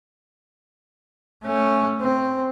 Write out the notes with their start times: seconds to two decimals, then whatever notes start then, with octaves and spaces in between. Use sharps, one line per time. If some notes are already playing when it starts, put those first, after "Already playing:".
1.45 A3 C#4
2.01 C4